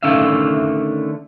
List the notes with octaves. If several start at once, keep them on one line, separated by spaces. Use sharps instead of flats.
D3 D#3 A3 C#4 E5 F5